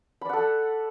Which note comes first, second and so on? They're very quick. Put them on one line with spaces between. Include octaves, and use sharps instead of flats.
B5 D5 F#5 A4